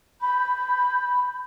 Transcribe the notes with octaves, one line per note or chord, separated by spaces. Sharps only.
B5 G6